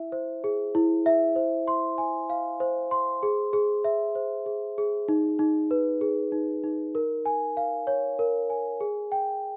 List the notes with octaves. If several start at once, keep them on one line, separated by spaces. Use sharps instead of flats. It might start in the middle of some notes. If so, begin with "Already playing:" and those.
Already playing: E4 E5
C5
G#4
E4
E5
C5
C6
G#5
F5
C5
C6
G#4
G#4
E5
C5
G#4
G#4
D#4
D#4
B4
G#4
D#4
D#4
A#4
G#5
F5
C#5
A#4
G#5
G#4
G5